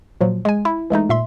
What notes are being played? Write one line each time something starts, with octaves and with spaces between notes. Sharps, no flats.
A#2 F3 F#3
G#3 G#5
E4
E3 G#3 A3 D#4
A#2 E5 C6